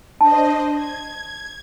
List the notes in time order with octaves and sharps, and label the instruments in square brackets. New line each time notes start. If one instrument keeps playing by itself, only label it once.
[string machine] D4 C5 D#5 [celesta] A5
[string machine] G#6